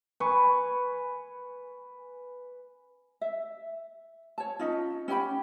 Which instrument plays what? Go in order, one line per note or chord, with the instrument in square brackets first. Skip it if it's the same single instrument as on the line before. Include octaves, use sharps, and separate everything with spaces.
[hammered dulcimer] B4 G#5 C#6
[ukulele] E5
C#5 A5
C#4 D#4 F4
C#4 G4 G5 B5